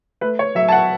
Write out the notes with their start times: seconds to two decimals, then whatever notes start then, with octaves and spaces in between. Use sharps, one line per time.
0.21 A3 B4
0.39 C#5
0.55 F#3 E5
0.68 A5
0.72 F#5